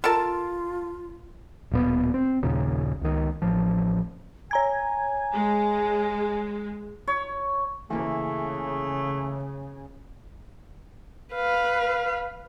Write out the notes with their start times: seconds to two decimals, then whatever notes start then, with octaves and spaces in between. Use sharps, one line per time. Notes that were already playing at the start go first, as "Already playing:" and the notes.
0.04 F4 A4 A#4 A5
1.71 D1 A#2 B3
2.14 C4
2.43 A#1 D#2 A#2 C#3
3.01 C#2 D#3
3.42 A1 F3
4.51 C#5 G#5 A#5 G#6
5.33 G#3
7.08 C#5
7.90 C#3 E3 A3 A#3 E4
11.34 B4 F5